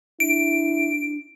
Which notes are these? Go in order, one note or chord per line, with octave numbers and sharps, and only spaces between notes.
D4 E4 D7